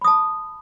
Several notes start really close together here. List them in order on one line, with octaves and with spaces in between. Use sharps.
B5 D#6 A5